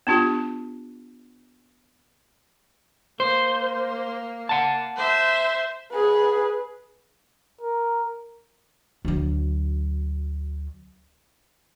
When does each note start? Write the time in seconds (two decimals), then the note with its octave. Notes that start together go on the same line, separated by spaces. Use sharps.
0.07 B3 D4 F4 G4
3.20 A#3 C5
4.49 F#5 A5
4.96 C5 E5
5.92 G#4 B4
7.61 A#4
9.05 D2 F#3